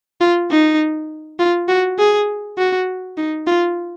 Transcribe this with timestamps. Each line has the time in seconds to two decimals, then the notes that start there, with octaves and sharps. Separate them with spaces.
0.21 F4
0.51 D#4
1.39 F4
1.69 F#4
1.99 G#4
2.58 F#4
3.18 D#4
3.47 F4